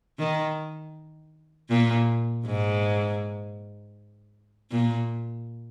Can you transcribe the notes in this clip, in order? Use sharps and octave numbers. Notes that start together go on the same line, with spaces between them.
D#3
A#2
G#2
A#2